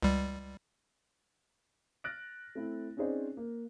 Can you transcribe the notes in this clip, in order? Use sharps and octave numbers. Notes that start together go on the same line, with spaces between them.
C#2 G3
F6 F#6 A6 A#6 D7
A3 C4 E4
C4 C#4 D#4 G#4 C5 D5
A#3